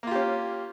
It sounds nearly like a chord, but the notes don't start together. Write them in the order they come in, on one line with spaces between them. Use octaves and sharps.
A#3 F4 G4 C#4